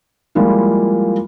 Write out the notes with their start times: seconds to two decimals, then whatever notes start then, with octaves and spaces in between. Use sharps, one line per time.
0.35 F3 G3 G#3 A#3 E4 F4